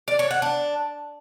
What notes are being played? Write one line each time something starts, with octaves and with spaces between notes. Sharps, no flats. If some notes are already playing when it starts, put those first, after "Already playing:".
D5
C#5
F#5
D4